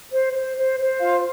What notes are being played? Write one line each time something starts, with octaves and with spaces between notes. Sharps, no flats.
C5
C5
C5
C5
F4 F5